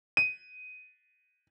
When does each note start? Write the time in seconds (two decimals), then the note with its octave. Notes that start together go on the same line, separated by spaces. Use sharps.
0.17 D#7